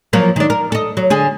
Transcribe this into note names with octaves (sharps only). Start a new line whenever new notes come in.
F3 F#3 A#3
D#3 D4
A#4
A4 D#5
F#3
D3 G#4